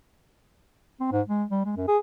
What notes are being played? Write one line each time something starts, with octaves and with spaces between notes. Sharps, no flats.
C4
G#2
G#3
G3
G#3
F#2
G#4